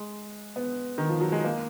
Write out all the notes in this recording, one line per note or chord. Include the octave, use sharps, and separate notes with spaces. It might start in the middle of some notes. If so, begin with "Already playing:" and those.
Already playing: G#3
B3
D#3
F3
F#3
G#3
A#3